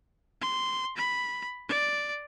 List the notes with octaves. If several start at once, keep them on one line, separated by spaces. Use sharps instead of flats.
C6
B5
D5